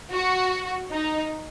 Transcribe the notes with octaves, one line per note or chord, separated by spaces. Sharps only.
F#4
D#4